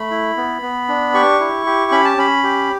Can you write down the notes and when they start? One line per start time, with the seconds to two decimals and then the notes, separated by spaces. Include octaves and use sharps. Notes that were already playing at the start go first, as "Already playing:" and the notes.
Already playing: A3 B5
0.11 E4
0.37 B3
0.62 B3
0.88 D4
1.14 G4 C#6
1.40 E4
1.66 G4
1.92 C#4 B5
2.05 A5
2.17 C#4 B5
2.44 G4